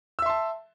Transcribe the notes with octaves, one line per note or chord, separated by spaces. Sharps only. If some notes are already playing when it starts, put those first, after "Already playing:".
E5 A5 C6 E6